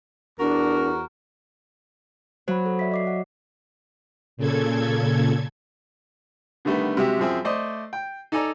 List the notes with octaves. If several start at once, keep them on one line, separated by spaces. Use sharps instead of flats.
E2 D4 F#4 A#4
F#3 C5 F#5 B5
A4
D5 E5 B6
D#5 D6 C7
F#5
A#2 C#3 A4 G#6
D3 D#3 G3 A3 B3
C3 F#3 G#3 G4 E5
F#2 F3 C4 G#4 E5 G5
A3 C5 D5 D#5
G5
D#4 A4 D5 G#5 A#5